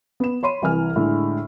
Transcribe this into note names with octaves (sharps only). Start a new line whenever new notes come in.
B3 E7
C#5 B5 C6 D#7
C2 E3 G#5 F6
A2 D3 G#3